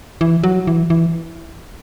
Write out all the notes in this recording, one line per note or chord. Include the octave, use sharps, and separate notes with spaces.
E3
F#3
E3
E3